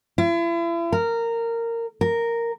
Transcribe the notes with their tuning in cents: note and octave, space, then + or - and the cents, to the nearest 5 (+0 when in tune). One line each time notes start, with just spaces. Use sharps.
E4 +40
A#4 -15
A#4 -5